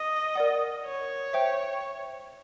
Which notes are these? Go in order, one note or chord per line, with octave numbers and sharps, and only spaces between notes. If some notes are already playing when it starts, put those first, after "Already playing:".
Already playing: D#5
A#4 D5 F#5
C#5
C5 E5 G5